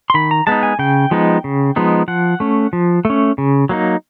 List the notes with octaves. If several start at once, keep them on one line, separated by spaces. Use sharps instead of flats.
C6
D#3 B5
A#5
G#3 B3 D#4 A5
G#5
C#3 G5
F3 G#3 B3 D#4
C#3
F3 G#3 B3 D#4
F3 F#5
A3 C#4
F3
A3
C#4
C#3
F#3 A#3 D#4